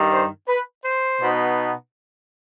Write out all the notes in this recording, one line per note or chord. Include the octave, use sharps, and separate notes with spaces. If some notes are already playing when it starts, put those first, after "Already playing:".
Already playing: G2 D#3 G3
C5
B4
C5
B2 B3 D#4